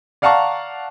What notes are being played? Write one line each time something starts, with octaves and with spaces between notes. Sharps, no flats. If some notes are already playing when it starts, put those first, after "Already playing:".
D5 F5 F#5 A5 A#5 C#6